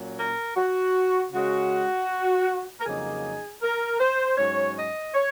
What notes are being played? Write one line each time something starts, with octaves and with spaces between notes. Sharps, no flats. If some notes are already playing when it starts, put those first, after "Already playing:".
Already playing: A#2 F#3 C#4
A#4
F#4
C#3 G#3 C#4 F#4
A#4
F2 C#3 F#3 A#3 D#4 G#4
A#4
C5
G#2 F#3 C#4 C#5
D#5
C#5